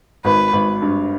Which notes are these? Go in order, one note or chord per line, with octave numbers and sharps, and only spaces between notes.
G#1 B4
G#1
G2